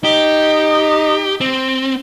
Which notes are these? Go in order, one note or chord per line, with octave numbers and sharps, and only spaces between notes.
D#4 G4
C4